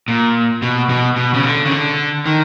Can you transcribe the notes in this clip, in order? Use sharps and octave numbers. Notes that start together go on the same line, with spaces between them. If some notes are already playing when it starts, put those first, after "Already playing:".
A#2
B2
B2
B2
C#3
D3
C#3
D3
D#3